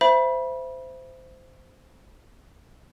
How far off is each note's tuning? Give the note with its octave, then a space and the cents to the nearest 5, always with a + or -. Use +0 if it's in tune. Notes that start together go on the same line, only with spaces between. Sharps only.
C5 -15 E5 +20 B5 -30